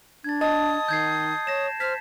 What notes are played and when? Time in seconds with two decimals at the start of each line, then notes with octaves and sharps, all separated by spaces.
0.24 D4 G#6 A6
0.41 D#5 A5 D#6 A6
0.88 D#3 G6 G#6 C7
1.47 C#5 A#6 E7
1.80 C5 F6 B6